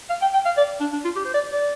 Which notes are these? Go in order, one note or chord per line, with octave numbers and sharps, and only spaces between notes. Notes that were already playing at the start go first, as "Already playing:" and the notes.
F5
G5
G5
F5
D5
D4
D4
F4
G4
C5
D5
D5